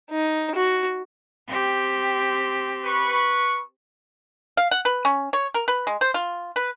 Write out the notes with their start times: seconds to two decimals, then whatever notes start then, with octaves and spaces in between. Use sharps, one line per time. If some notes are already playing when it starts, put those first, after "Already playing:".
0.10 D#4
0.55 F#4
1.48 C4 G4
2.84 B4 C#6
4.57 F5
4.71 F#5
4.85 B4
5.05 C#4
5.33 C#5
5.54 A#4
5.68 B4
5.87 G#3
6.01 C5
6.14 F4
6.56 B4